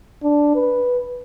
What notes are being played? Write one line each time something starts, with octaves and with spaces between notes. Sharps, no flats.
D4
B4